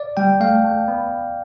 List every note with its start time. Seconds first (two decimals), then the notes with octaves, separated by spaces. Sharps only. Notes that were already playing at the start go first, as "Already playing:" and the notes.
Already playing: D5
0.17 G3 G5
0.40 A3 F5
0.64 A3
0.88 B3